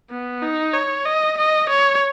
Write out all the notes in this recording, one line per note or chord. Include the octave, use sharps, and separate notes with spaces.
B3
D#4
C#5
D#5
D#5
C#5